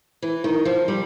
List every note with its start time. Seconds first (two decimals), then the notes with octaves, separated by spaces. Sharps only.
0.22 E3
0.44 D#3
0.65 F3
0.88 G3